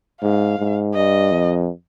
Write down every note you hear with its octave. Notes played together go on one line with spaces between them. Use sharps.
G#2 F5
G#2
G2 D#5
F2